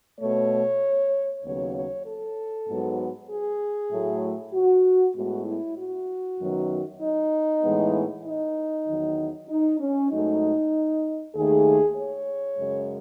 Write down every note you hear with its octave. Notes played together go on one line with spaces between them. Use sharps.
B2 A3 C#5
D#2 C#3 F#3 B3 C#5
C#5
A4
G#2 F#3 B3
G#4
A2 F#3 A3
F#4
A2 G#3 B3 F#4
E4
F#4
F#2 D#3 F#3 B3
D#4
A2 E3 G#3 B3
D#4
E2 D#3 F#3
D#4
C#4
G#2 F#3 A3 D#4
D#2 D#3 A3 G#4
C#5
F#2 C#3 G#3